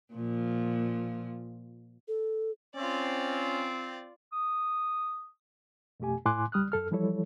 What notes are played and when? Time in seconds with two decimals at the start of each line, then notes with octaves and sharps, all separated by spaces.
0.13 A#2 F3
2.08 A4
2.75 C4 C#4 F4 D5
4.32 D#6
6.00 F2 B2 A3 G4 G#5
6.25 A2 E4 G#5 C6 D6 F#6
6.52 C#2 G3 D#6 F6 F#6
6.72 F#2 A4 F6
6.91 E3 F3 G3 E4 A4 C#5